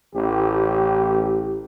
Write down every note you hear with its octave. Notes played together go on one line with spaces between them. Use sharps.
A1 G4